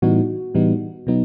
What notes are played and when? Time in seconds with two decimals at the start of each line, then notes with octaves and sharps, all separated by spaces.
0.02 A2 E3 G3 B3 D#4 F#4
0.55 A2 E3 G3 B3 D#4
1.07 B2 F#3 B3 D#4